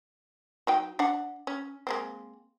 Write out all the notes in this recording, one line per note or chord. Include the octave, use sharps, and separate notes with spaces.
F#3 D#4 G5
D4 F#5
C#4
G#3 A#3 C4